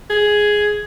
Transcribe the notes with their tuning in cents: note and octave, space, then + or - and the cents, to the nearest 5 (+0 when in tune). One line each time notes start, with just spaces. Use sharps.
G#4 +5